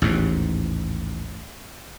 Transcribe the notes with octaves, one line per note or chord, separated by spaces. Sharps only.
A1 D#2 G#2